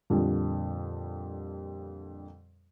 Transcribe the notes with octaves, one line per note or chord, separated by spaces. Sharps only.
F2 A#2 D3 G3